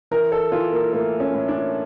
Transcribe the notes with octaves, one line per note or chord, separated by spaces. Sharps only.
E3 A#4
A4
E3 F4
A#3
A2 A#3
C#4
A2
D4